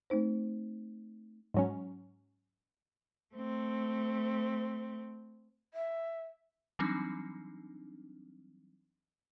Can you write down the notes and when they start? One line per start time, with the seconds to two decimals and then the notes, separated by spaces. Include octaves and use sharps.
0.10 A3 C4 D#4 C5
1.54 G#2 F#3 C#4
3.35 A3 C4
5.74 E5
6.79 E3 F#3 G3 C4 D4 D#4